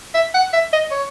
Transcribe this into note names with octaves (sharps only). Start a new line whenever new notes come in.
E5
F#5
E5
D#5
C#5